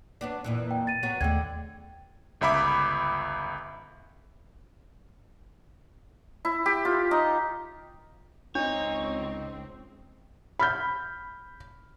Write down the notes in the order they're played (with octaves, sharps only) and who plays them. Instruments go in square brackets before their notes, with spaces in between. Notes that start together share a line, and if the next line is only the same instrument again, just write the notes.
[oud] F#3 B3 D4
F2 A#2 E3
[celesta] G5
A6 D#7
[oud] F#3 B3 F#4
[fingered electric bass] D#2 A3 [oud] D3 G#3 [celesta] G5 G#6
[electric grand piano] G1 C#2 E5 B5 D6
[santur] E4
G4
F4
D#4
[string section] C#2 C4 [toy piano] D4 [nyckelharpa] D#4 [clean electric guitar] C#5
[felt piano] B5 F6 G6